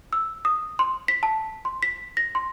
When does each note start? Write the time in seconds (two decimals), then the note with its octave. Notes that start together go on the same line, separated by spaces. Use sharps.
0.13 E6
0.45 D#6
0.79 C6
1.08 B6
1.23 A5
1.65 C6
1.83 B6
2.17 A#6
2.35 C6